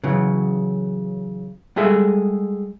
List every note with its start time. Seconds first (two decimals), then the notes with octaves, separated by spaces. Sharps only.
0.04 C#3 E3 F#3
1.76 G3 G#3 F#4 G#4 A4 E5